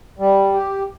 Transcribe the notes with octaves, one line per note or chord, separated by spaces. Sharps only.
G3
G4